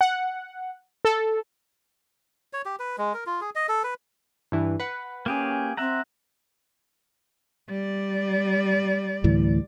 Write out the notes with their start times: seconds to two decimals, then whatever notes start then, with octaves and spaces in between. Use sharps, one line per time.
0.01 F#5
1.05 A4
2.53 C#5
2.65 G4
2.80 B4
2.98 G#3
3.14 A#4
3.26 F4
3.41 G#4
3.55 D#5
3.69 A4
3.84 B4
4.52 G2 E3
4.80 B4 F#5
5.26 A#3 C#4 G4 G#4
5.77 C4 E5 F#5 A#5
7.69 G3 D5
9.24 D2 A2 E3